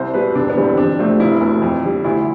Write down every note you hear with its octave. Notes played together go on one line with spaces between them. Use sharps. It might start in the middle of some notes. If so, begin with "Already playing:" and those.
Already playing: C2 C5
B2 G3 B4
E1 D4
B3
E2 D3 G3
C4
F2 D4
C3 F3 A3 C4
F1 E4
E2 B2 A3
F2
D3 G3
D2 E4